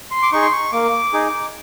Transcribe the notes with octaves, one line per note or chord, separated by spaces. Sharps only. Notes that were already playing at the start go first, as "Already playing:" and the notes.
C6
D6
D#4 G#4 C#6
C6
C#6
A#3 D6
D#4 G#4